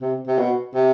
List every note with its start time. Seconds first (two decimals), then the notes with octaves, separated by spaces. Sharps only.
0.01 C3
0.27 C3
0.39 B2
0.75 C3